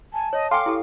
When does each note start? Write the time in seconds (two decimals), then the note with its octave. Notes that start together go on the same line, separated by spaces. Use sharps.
0.13 G#5 A5
0.33 C#5 D#5
0.51 A4 F5 G5 G#5 C6 D6
0.66 E4 G4 A4